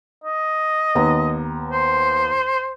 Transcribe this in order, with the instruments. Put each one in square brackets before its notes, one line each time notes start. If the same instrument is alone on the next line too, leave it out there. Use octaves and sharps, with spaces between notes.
[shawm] D#5
[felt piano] D#2 B3 A#5
[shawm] C5